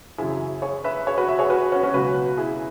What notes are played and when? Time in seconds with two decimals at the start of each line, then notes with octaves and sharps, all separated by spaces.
0.18 F#2 C#3 E3 E4 G#4
0.62 G#4 C#5
0.84 B4 E5
1.06 G#4 C#5
1.18 F#4 B4
1.29 B4 E5
1.39 G#4 C#5
1.50 F#4 B4
1.72 C#4 F#4
1.83 C#4 F#4
1.94 C#2 B2 F#3 F#4 B4
2.37 E4 G#4